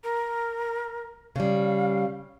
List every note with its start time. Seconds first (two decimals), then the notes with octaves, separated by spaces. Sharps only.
0.04 A#4
1.36 C#3 G3 F5